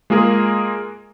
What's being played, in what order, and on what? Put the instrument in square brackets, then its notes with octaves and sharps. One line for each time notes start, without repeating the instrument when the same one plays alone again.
[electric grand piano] G#3 A#3 F4 G#4 A#4